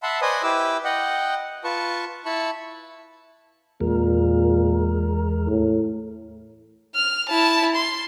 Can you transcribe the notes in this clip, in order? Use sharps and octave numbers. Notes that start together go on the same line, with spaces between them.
E5 F#5 A5 B5 C6
B4 C5 D5 D#5 G#5 D#6
E4 G4 B4 D6 E6
D#5 F#5 G5
F4 B4 A5 C#6
E4 A5 B5 C#6
E2 A#2 G#3 A#4
A2
F6
E4 A5
C6